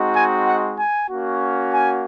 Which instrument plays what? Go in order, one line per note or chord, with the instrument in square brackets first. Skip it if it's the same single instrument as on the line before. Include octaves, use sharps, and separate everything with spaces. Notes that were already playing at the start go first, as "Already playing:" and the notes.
Already playing: [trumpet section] G#3 C4 D#4 F#4
G#5
F#5
G#5
A#3 C#4 F#4
G#5